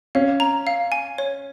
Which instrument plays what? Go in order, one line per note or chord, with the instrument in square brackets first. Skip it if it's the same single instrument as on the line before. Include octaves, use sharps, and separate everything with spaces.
[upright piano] C#4 [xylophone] F5
[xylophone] A#5
F5
G#5
C#5